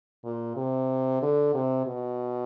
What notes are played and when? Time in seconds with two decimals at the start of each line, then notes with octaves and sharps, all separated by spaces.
0.24 A#2
0.56 C3
1.22 D3
1.54 C3
1.87 B2